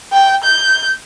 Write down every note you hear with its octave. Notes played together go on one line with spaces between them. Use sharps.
G5
G6